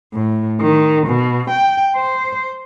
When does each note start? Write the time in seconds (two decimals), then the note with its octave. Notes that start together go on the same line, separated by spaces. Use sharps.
0.14 A2
0.61 D#3
1.07 B2
1.51 G5
1.96 C5